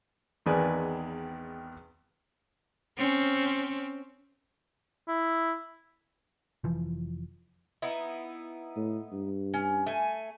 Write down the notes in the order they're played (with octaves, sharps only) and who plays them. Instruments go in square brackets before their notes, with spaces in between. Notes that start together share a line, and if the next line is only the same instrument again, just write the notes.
[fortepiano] G#1 E2 D#3 B4 D5 G#5
[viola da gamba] C4 C#4
[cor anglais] E4
[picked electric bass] F1 E3 F3
[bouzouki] B3 D#4 E4
[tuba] A2
G2
[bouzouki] C#4
A3 G#5